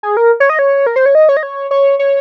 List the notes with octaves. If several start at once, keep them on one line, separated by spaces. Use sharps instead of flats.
G#4
A#4
C#5
D#5
C#5
A#4
C5
C#5
D#5
C#5
D#5
C#5
C#5
C#5